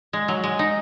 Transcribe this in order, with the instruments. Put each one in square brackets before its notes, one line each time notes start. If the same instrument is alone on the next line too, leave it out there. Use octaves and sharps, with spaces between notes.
[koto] G#3
F#3
G#3
D#4